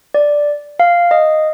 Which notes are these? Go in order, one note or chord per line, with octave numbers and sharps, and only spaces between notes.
D5
F5
D#5